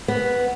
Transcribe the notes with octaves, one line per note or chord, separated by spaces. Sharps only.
B3